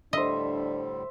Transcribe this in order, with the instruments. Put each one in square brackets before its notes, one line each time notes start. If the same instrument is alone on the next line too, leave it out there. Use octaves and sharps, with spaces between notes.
[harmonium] A2 D3 G3 [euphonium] D4 [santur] C5 E5 [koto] D#5